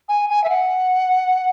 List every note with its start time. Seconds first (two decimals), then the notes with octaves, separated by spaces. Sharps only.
0.09 G#5
0.30 G#5
0.44 E5
0.49 F#5